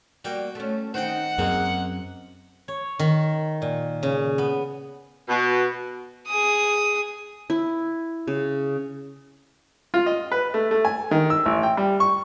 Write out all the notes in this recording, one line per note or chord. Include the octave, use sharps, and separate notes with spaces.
G3 A#3 F#4 G5
A3 C#4
D#3 C4 D#4 C5 F#5 G5
F#2 G#3 A#3 C4 G#4
C#5
D#3
A#2
C#3
B3
B2
G#4 D#6
E4
C#3
F4
D#5
B4
A3
A3
G#5
D#3
E6
A1
G5
G3
C#6